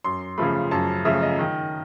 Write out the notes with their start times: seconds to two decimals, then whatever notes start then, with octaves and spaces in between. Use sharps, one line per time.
0.04 F#2 C6
0.38 C#3 F3 A3 B5
0.71 F#2 A5
1.05 C#3 F3 A3 E5
1.22 D#5
1.39 D#3